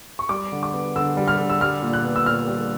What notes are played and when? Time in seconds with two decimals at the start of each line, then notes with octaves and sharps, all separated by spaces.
0.19 C#6
0.29 G3 D6
0.52 D3
0.63 D6
0.73 B3
0.96 D3 E6
1.17 G3
1.28 F6
1.39 D3
1.50 E6
1.61 G3 F6
1.82 A#2
1.93 F#6
2.04 B3
2.16 E6
2.26 A#2 F6
2.48 G3